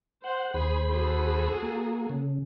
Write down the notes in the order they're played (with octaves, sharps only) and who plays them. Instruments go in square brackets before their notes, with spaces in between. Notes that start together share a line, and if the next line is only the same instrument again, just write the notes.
[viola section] C5 [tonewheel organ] F#5
[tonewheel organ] D#2 C5 B5 [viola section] G#4
[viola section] F#4 G#4 A4
[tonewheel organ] A#3
C#3